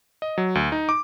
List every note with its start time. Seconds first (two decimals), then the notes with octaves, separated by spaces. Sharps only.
0.22 D#5
0.38 F#3
0.55 D2
0.72 D#4
0.89 D6